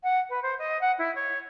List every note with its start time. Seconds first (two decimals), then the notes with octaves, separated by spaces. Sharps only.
0.03 F#5
0.29 B4
0.42 C5
0.59 D#5
0.81 F#5
0.98 E4
1.15 C#5